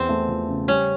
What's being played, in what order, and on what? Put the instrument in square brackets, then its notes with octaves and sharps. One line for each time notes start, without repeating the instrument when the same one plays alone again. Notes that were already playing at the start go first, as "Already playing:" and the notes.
Already playing: [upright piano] E2 [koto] C4
[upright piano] A3
F3
C#3
[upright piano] G3 [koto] C#4